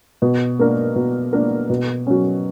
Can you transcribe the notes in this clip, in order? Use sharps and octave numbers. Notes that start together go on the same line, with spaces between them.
B2
A#3 D4 A#4
B2
A#3 D4 A#4
B2
F#3 C#4